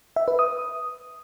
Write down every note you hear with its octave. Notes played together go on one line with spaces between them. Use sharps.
E5
B4
D#6